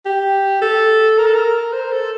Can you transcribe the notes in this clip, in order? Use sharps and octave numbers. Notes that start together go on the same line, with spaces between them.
G4
A4
A#4
A4
A#4
C5
A4